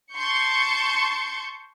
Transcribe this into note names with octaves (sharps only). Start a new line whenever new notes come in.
A5 C6 C#6 G6 C#7